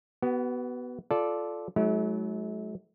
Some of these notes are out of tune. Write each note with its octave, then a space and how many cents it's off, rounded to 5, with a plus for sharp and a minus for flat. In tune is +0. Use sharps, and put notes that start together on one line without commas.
B3 +0 F#4 +40
F4 +0 A4 -15 D5 +0
F#3 +0 A3 -45 E4 -40